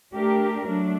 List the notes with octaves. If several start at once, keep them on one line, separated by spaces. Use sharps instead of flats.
A3 D4 G4 A#4
F#3 A3 D4